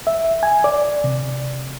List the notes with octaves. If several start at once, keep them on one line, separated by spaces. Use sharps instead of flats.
E5
G#5
D5
C3